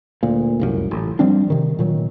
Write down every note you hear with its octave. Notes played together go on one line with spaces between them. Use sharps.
D2 A#2
F1 C2 F#2
A1
F3 G3 C4 D4
C3 D#3
A#2 D#3 F#3